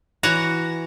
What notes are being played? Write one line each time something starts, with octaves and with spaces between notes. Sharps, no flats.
E3 F#4 C#5 F#5 A#5